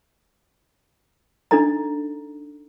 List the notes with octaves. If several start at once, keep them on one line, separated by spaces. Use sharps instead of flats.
D4 D#4 A4 D#5 A#5